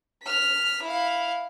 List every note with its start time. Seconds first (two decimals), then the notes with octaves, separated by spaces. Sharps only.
0.23 F6 B6
0.82 E4 F5